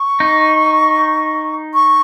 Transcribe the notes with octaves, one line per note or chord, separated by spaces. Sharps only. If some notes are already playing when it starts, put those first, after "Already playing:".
Already playing: C#6
D#4
C#6